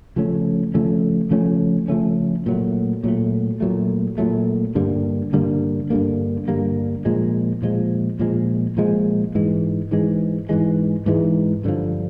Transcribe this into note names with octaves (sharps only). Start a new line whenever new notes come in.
C#3 F3 A3 C#4
C#3 F3 A3 C#4
C#3 F3 A3 C#4
C#3 F3 A3 C#4
A#2 F#3 A3
A#2 F#3 A3
A#2 F#3 A3
A#2 F#3 A3
G2 D3 G3 A#3
G2 D3 G3 A#3
G2 D3 G3 A#3
G2 D3 G3 A#3
A#2 F3 G#3
A#2 F3 G#3
A#2 F3 G#3
A#2 F3 G#3
G#2 E3 G#3
G#2 E3 G#3
G#2 E3 G#3
G#2 E3 G#3
G2 D3 F3